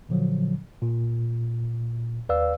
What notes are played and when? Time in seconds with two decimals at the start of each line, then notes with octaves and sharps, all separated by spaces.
0.09 A#2 D3 F3 F#3
0.82 A#2
2.29 D#2 B4 D5 F5 E6